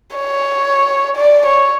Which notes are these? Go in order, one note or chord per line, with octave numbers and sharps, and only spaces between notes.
C#5
D5
C#5